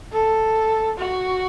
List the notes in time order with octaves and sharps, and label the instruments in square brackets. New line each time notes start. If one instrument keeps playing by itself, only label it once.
[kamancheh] A4
F#4